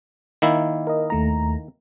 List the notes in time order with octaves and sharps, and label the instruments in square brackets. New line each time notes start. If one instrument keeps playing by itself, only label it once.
[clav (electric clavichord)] D#3 A#3 E4
[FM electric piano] A#4 D#5
D#2 A3 A#5